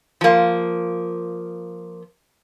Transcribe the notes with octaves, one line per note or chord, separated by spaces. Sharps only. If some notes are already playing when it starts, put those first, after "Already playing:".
F3 A#3